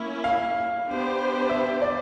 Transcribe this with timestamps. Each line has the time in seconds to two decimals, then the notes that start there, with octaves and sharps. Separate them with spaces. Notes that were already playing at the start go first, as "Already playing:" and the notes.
Already playing: A#3 C#4 E4
0.24 F5
0.87 B3 D4 G4 C5
1.50 E5
1.82 D5